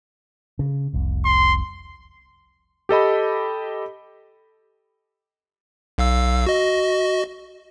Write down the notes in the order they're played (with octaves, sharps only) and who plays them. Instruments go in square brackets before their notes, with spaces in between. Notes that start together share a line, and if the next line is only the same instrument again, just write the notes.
[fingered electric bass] C#3
F1 C2
[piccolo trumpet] C6
[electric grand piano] G4 A4 D#5 B5
[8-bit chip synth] B1 F5 E6
F#4 D#5